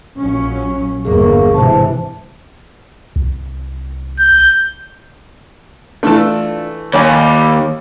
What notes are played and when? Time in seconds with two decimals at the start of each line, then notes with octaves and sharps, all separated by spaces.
0.18 A#1 F#3 C#4
1.05 G1 E2 A#3 G#4 A#4 C#6
1.54 G#2 C3 E3 C5 A5
3.16 C2
4.19 G6
6.03 E3 A3 D4 F4 A4
6.93 D#2 G3 C#5 G#5